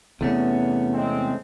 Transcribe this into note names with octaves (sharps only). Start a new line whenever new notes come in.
E2 C3 A3 B3 C#4
G#3 C4